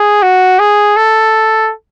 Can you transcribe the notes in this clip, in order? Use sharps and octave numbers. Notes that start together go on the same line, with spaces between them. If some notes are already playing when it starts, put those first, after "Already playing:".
Already playing: G#4
F#4
G#4
A4